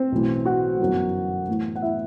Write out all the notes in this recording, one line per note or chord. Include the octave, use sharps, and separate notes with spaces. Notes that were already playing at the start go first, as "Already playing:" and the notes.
Already playing: C4 C5
B1 A2 E3
F#4 F#5
G1 F#2 E3
A1 A2 E3
F#5
E4 E5